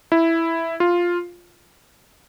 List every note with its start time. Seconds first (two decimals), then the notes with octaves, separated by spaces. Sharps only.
0.12 E4
0.80 F4